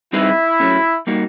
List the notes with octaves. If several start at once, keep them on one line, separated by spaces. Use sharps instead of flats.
G3 C4 D#4 E4 G#4 B4
F#3 A3 C#4
G3 A#3 D#4 F#4